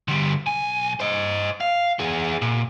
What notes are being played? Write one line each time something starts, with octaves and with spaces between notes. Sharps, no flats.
D3 G3
B1 G#5
C5 D#5
F5
B3 G#4
A#2